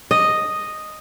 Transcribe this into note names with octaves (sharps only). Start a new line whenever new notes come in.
D#5